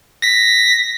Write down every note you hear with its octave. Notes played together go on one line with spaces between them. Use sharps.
A#6 B6